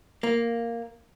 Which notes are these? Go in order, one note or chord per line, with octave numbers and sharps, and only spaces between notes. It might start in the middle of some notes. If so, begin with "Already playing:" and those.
A#3